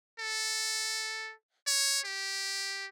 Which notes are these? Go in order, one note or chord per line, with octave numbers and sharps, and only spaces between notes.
A4
C#5
G4